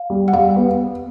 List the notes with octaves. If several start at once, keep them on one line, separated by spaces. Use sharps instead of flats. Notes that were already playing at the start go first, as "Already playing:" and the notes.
Already playing: F5
G3
F#5
G3 F5
B3